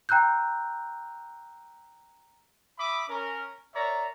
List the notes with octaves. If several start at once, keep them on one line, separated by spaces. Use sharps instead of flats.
G5 A#5 E6 F#6 G6
E5 B5 D6 D#6
C#4 A#4
A#4 C#5 D5 E5 A#5